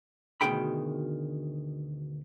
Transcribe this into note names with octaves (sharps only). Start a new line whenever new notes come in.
D2 B2 D#3 G#4 G5 B5